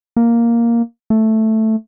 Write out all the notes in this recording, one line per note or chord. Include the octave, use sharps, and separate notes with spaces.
A#3
A3